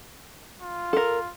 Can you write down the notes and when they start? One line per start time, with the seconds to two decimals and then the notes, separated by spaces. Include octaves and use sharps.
0.61 F4
0.93 A4 A#4